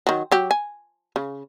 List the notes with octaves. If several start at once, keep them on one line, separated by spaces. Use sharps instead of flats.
D#3 F#3
F#3 G4
G#5
C#3